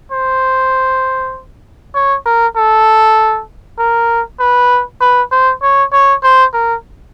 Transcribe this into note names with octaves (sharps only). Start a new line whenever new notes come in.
C5
C#5
A#4
A4
A#4
B4
B4
C5
C#5
C#5
C5
A#4